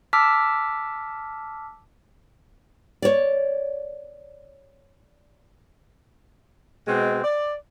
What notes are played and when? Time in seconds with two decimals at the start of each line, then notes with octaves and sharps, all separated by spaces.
0.13 A5 D6 E6 F6 B6
3.02 C#5 D5
6.87 B2 G#3 C4
7.24 D5